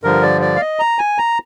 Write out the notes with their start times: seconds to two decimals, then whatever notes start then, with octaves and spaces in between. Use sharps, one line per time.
0.03 G2 D3 F3 A#4
0.23 D5
0.42 D5
0.56 F5
0.61 D#5
0.79 A#5
0.99 G#5
1.18 A#5